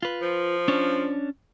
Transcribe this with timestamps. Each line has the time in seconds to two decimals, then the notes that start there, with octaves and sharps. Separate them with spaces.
0.03 F4 B4
0.22 F3
0.68 C#4 D4 C#5